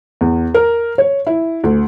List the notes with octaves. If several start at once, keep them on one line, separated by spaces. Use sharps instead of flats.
E2
A#4
C#5
E4
D2